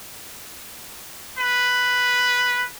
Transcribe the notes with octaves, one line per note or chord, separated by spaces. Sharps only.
B4